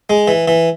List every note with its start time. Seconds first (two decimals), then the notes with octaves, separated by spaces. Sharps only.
0.10 G#3
0.28 E3
0.48 E3